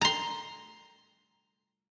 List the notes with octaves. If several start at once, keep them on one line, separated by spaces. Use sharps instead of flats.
A#5 C6